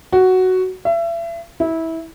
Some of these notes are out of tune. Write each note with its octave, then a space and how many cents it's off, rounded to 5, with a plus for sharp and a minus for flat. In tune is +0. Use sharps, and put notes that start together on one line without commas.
F#4 +5
E5 +35
E4 -20